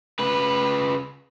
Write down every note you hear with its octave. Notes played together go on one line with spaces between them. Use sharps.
C#3 B4